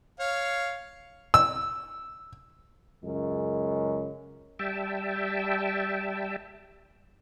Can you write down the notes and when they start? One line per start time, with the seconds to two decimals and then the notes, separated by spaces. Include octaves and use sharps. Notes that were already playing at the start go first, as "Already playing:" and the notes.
0.20 C#5 F5
1.34 E6
3.03 C#2 F#2 C#3 G#3
4.59 G3 E5 G5 A5